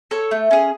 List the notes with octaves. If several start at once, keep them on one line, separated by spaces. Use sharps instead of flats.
A4 C#5
A3
C#4 G#4